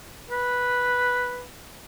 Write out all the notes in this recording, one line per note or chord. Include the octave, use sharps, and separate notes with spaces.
B4